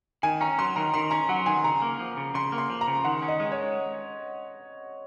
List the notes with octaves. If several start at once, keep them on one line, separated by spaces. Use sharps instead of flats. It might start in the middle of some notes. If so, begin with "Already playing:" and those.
D#3 G#5
C#4 A#5
F#3 C6
D#3 A#5
D#3 C6
C#4 A#5
F#3 F#5
D#3 G#5
C#3 A#5
A#3
F3
C#3
C#3 C6
A#3
C6
F3
A#5
C#3
D#3 F#5
C#4
D#5
G#3
C#5